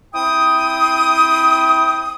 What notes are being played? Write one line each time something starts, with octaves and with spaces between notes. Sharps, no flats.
C4 E4 G5 D#6